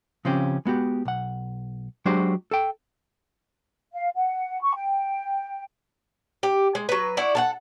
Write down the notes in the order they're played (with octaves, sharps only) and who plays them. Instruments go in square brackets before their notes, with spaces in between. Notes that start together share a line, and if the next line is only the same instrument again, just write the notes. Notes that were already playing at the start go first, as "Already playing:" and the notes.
[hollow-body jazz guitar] C#3 F3 C4 C#4 G4
G#3 B3 F#4 G4
B1 F#5
F#3 G#3 D4 F#4 G4 C5
A4 G5
[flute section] F5
F#5
C#6
G5
[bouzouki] G4
G#3
F#3 B4
E4 F#4 D5
A4 F5 F#5